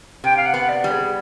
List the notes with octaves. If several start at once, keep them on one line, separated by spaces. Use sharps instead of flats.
C3 G5
F5
F#5
B3
D5
G3
G#4